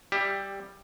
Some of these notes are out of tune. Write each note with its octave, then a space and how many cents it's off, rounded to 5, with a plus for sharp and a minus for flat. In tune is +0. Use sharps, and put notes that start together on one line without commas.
G3 +0 G4 +15 E5 +0